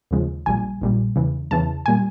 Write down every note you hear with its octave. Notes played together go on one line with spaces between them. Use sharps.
D#2 C#3 F3 G#3
A#1 A#2 G3 G#5
A#1 A#2 G3
E2 C#3 E3
E2 C#3 E3 A5
A#2 G3 G#5